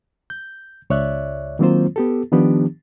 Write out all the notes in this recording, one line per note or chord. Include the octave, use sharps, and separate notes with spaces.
G6
C#2 C#5 D5 E5 F#6
D#3 F#3 A#3 C4 F4 C5
B3 G4 A4
D#3 F3 B3 D4 G4